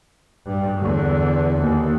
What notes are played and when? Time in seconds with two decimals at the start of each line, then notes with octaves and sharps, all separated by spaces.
0.46 G2 G3
0.78 E2 D3
1.61 D#2